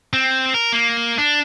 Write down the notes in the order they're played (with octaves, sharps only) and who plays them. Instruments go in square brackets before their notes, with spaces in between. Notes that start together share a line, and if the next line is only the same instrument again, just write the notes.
[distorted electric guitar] C4
A#4
A#3
D4